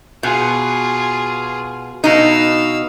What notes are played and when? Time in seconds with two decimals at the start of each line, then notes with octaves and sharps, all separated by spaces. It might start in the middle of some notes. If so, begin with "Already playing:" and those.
0.23 B2 F4 G#4
2.04 B2 D#4 F5 E6